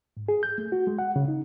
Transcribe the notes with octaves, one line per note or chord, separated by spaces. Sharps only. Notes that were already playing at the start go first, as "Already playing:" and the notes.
G#2
G#4
G6
A3
F#4
G#3
F#5
C#3
D#4